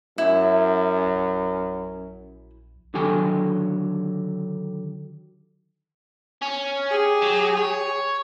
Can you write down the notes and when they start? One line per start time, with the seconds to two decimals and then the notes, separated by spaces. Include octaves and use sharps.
0.18 F#2 E4
1.05 A#1
2.94 D3 D#3 F#3 G4 A4 G#5
6.42 C#4
6.90 G4 G#4
7.22 F#3
7.57 C#5